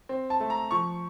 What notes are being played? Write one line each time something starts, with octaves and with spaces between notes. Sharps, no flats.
C4
A5
A3
A#5
F3 C#6